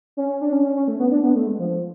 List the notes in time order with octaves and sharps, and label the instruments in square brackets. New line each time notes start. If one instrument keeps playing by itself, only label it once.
[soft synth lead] C#4
C#4
D4
C#4
C#4
C#4
A3
B3
D4
B3
A3
G#3
F3